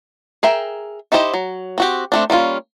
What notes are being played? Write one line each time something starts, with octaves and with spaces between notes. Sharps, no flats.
G#4 A#4 E5 G5
D#4 E4 G4 C5 D#5
F#3
C4 F#4 G4
A3 C4 D4
G3 A#3 C#4 F4